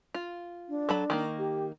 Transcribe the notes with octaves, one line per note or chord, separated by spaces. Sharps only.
F4
D4
F#3 A4 B5
D#3 G#3 A#3
G4